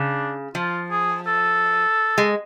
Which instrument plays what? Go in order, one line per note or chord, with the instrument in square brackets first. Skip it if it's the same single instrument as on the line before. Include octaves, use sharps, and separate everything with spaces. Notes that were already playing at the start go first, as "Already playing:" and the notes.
Already playing: [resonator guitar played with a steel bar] C#3 [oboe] D4
[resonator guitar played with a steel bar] F3 [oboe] F4
[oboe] G#4
A4
[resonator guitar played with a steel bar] G#3